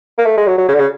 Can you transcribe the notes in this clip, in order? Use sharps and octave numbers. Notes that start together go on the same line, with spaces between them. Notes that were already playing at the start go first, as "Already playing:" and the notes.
A#3
A3
G#3
F#3
F#3
C#3
D3
C#3